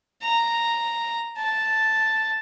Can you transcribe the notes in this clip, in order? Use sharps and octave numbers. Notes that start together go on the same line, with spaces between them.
A#5
A5